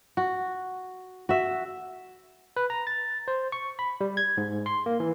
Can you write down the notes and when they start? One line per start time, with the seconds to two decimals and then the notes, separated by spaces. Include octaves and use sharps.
0.17 F#4
1.29 F#4 E5
2.57 B4
2.70 A#5
2.87 A6
3.28 C5
3.52 C#6
3.79 B5
4.01 G3
4.17 G#6
4.37 G#2
4.66 C6
4.86 A#3
5.00 E3